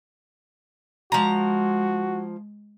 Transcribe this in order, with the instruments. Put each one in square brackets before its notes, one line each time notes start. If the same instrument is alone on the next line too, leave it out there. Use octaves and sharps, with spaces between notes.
[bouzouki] F3 A#5 [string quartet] G#3 [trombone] F#4